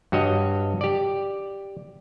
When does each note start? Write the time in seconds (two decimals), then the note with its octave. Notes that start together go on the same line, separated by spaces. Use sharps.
0.12 G2 F#4 C#5 D#5
0.81 G4 D5